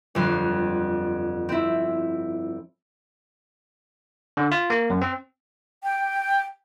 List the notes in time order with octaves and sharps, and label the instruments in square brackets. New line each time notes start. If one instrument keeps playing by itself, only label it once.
[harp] G1 F2 C6
C4 E4
[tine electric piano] D3
F4
A#3
F#2
C4
[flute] G5